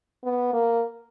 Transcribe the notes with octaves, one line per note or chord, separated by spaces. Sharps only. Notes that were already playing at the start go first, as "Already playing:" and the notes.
B3
A#3